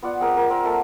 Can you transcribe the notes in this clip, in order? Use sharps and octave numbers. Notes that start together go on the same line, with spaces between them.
B3 F4 D5 F#5
C4 G#4 A#4
A#4 G5
C4 A#4
A#3 A4 E5 F#5